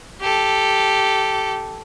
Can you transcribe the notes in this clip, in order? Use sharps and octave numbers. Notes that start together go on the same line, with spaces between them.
G4 A4